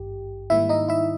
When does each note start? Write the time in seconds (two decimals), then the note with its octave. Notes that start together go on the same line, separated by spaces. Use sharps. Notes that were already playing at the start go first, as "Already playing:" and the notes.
Already playing: G#1 G2 D#3 G4
0.50 G#2 D#3 G3 A#3 E4 E5
0.69 D#4 D#5
0.89 E4 E5